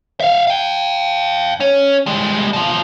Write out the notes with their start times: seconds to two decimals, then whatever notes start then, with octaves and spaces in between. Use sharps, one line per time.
0.20 E5 F5
0.47 F5 G5
1.60 C#4
2.06 G3 G#3
2.53 B2 F3